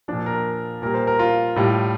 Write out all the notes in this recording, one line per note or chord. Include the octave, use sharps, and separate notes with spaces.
A#2 F3 D4
A#4
A#2 G3 A#4
C5
A#4
F4
A2 G3